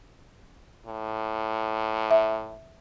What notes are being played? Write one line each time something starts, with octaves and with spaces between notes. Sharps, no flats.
A2
E5